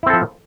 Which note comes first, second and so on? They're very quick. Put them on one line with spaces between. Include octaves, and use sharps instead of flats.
E4 C4 A4 F3